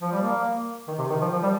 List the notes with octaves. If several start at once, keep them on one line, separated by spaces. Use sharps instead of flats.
F3
G3
A#3
D#3
C3
D#3
F3
F3
G3